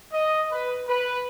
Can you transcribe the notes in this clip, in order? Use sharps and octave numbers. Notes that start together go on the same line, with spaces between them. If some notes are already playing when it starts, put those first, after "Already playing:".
D#5
B4
B4